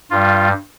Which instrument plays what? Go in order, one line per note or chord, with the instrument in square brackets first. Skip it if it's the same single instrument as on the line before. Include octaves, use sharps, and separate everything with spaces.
[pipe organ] G2 G3 F4